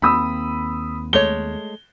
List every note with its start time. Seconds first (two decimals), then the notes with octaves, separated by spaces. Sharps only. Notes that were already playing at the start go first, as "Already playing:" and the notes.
0.02 D#2 A#3 C4 B5 D#6 E6
1.13 G#3 A3 C#5 G7